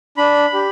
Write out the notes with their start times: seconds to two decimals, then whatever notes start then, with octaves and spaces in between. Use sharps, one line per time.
0.17 D4 B5
0.54 G4